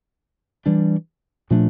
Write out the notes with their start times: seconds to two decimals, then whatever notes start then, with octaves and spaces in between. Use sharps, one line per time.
0.66 E3 G3 D4
1.51 A#2 F3 A3 D4